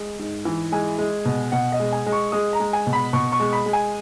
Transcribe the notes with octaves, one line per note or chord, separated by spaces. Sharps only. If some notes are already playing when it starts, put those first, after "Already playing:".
Already playing: G#3
G#2
E3
G#3 G#5
G#3
B2
B2 F#5
D#5
G#3
G#5
G#3
C#6
G#3 D#6
A#5
G#3
G#5
B2
B5
B2 C#6
C#6
G#3
B5
G#3
G#5